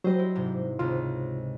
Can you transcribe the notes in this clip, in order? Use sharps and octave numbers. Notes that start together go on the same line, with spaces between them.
F#3 G3 C5 D#5
E4
G#2 C3
C#2 C3 F4